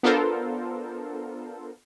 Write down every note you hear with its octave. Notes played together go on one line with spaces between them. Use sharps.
B3 D4 F4 A4 A#4 C5